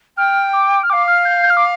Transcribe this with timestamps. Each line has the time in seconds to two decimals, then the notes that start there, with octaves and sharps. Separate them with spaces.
0.17 G5 F6
0.53 D6
0.83 F6
0.89 F5 G5 D6
1.08 F6
1.25 G6
1.43 G6
1.50 F6
1.57 D6